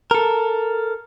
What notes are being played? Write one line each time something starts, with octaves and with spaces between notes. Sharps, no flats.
A4 A#4